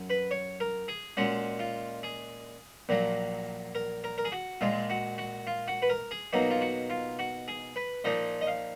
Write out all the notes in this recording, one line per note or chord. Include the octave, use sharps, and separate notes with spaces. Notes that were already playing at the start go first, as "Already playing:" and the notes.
Already playing: F#2
B4
C#5
A#4
G#4
A#2 G#3 C#4 F#4
F4
G#4
A#1 A#2 F#3 A#3
A#4
A#4
A#4
G#4
F#4
A#1 A#2 G#3 F4
F#4
F#4
F4
F#4
B4
A#4
G#4
B2 F#3 A#3 D#4 F#4
F4
F#4
F4
F#4
G#4
B4
A#2 F3 A#3 D#4 D#5
D#5
F5